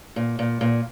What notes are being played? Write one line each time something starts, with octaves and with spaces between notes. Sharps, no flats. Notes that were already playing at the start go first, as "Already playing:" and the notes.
A#2
A#2
A#2